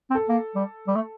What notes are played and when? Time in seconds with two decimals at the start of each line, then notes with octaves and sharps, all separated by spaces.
0.10 C4
0.15 A4
0.29 A#3
0.55 G3
0.87 G3
0.95 A3